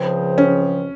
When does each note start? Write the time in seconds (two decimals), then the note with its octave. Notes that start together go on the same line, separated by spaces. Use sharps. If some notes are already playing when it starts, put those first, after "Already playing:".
Already playing: C#2 C#3 F3 C4
0.38 C#4